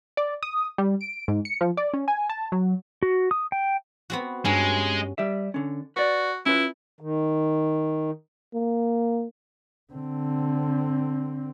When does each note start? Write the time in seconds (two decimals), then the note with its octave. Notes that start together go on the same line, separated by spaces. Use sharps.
0.17 D5
0.43 D#6
0.78 G3
1.01 D7
1.28 G#2
1.45 C#7
1.61 F3
1.77 D5
1.94 C#4
2.08 G#5
2.29 A5
2.52 F#3
3.03 F#4
3.31 D#6
3.52 G5
4.10 B3 C4 F#4
4.45 G2 G#3 C#4
5.18 G3 G4 E5
5.54 D3 C#4
5.96 F#4 B4 D5
6.46 C#4 E4 F4 B4
7.01 D#3
8.54 A#3
9.93 D3 C4